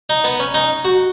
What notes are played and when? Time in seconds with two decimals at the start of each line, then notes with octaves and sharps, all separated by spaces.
0.10 D#4
0.24 B3
0.40 C#4
0.54 D#4
0.85 F#4